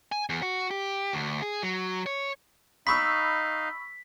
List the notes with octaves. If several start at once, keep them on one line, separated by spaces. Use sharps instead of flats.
G#5
E2
F#4
G4
D2
G#4
F#3
C#5
D#4 D#5 F5 B5 C#6 E6 B6